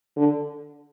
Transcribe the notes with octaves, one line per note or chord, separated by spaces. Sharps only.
D3